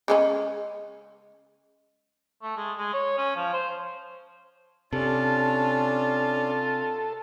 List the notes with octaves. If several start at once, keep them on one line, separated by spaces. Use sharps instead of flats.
C#3 G#3 C#4
A3
G#3
G#3
C#5
C#4
F3
C5
C3 C#4 D4 F4 A4